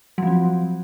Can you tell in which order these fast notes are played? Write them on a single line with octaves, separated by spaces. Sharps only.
F#3 F3 C4